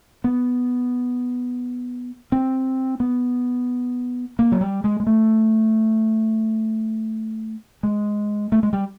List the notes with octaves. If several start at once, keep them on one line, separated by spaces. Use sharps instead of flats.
B3
C4
B3
A#3
F#3
G3
G#3
G#3
A3
G#3
A3
G#3
G3